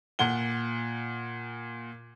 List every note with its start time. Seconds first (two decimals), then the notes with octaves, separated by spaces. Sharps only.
0.19 A#2 F#5 G7